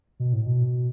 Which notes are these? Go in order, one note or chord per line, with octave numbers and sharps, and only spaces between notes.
B2
A2
B2